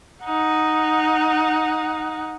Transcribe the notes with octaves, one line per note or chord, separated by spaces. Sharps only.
D#4 F#5